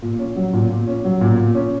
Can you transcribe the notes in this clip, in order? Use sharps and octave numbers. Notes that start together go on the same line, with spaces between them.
A#2
C#4
F#3
A#2
A#2
C#4
F#3
A#2
A#2
C#4